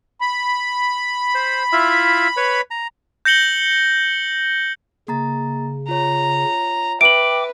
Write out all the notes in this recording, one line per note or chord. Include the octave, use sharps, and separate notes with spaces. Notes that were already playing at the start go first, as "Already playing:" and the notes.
B5
C5
E4 F4 E5
B4 C#5
A#5
G6 A#6 C#7 F#7 G7
C#3 A#3 A#5 A6
F4 C#5 A#5
B4 E5 G5 D6 D7 F#7